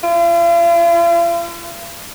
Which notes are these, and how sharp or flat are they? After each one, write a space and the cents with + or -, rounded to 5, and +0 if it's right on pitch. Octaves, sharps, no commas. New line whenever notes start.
F4 -45